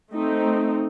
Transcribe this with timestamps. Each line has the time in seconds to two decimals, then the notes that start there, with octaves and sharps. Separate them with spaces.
0.13 A3 C4 D#4